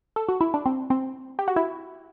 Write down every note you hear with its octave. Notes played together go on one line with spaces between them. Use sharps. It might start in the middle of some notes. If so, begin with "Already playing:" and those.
A4
F#4
E4
D4
C4
C4
G4
F#4
E4